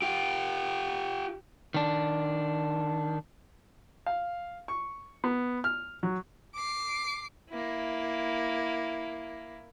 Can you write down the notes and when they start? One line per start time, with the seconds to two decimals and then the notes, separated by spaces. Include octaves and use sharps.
0.02 F4 G4
1.74 D#3 D4
4.06 F5
4.68 C#6
5.24 B3
5.64 F6
6.03 F#3
6.55 D6 C7
7.50 A#3 E4